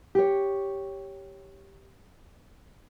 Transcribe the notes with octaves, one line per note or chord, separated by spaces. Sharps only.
G4 C#5